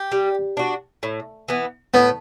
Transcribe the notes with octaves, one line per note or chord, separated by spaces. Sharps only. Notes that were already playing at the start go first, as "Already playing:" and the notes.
Already playing: G4
G3
D4 F#4
A2
E3 B3
A2 B3